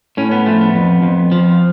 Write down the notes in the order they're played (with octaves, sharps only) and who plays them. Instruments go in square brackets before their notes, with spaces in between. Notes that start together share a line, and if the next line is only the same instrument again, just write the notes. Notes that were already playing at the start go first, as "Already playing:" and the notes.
[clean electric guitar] A2 C#4
B3
F3 A3
B3
F2
F2
F3